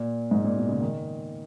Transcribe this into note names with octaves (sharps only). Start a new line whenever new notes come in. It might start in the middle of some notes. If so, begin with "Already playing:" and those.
Already playing: A#2
G#2
A#2
B2
C#3
D#3